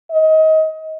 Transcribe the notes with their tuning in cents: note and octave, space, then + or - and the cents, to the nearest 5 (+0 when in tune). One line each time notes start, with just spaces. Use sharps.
D#5 +25